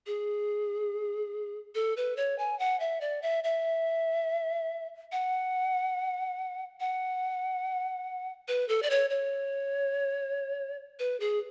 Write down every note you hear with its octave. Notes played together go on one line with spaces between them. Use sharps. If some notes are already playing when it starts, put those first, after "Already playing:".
G#4
A4
B4
C#5
G#5
F#5
E5
D5
E5
E5
F#5
F#5
B4
A4
D5
C#5
C#5
B4
G#4